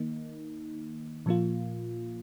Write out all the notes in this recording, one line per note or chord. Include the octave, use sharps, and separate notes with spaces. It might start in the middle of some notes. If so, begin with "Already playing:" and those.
Already playing: D#3 A#3 D#4
A#2 F3 A#3 F4